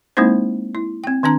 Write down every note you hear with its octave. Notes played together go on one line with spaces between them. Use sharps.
G#3 A#3 C4 D#4 E4 C5
E4
C4 G5
D#3 C4 D4 A#5